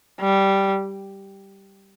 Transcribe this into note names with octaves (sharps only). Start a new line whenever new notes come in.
G3